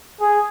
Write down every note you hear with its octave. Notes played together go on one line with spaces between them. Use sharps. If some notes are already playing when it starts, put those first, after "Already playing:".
G#4